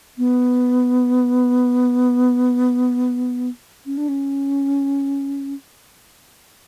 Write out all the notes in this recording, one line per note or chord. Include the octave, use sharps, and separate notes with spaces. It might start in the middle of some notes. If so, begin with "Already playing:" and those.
B3
C#4
D4
C#4